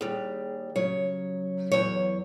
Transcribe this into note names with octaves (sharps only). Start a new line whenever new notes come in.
D#2 G3 G#4
C#3 F#3 C#5
E2 C#5